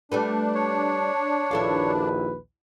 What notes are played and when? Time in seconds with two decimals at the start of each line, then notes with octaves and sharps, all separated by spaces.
0.12 G3 A3 D4 B4
0.55 C#5
1.51 A#1 D#2 E4 A4 B4 F5